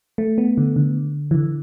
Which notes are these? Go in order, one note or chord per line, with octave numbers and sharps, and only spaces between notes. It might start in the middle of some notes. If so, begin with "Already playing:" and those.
A3
B3
D3
D3
E3
D3